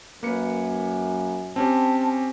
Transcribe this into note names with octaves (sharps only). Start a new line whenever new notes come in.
F#2 A#3 B4 C#7
C4 C#4 G4 A5